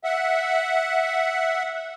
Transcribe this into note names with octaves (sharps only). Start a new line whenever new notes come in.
E5 F#5